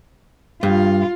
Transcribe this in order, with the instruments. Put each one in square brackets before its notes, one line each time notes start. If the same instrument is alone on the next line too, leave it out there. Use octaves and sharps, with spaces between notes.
[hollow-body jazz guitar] G2 [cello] F4